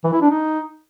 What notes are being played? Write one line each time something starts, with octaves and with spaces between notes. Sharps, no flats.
E3
E4
D4
D#4